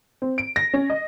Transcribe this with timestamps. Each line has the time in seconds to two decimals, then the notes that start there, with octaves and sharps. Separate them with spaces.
0.22 C4
0.38 D7
0.56 A#6
0.74 C#4
0.90 D#5